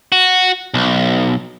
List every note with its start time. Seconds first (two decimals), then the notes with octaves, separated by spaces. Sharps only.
0.12 F#4
0.74 B1